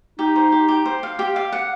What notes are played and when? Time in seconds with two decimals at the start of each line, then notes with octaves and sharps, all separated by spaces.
0.19 D#4 G4
0.36 C5
0.52 G4
0.68 G4
0.86 C5
1.03 F5
1.19 G4
1.36 F5
1.53 F#5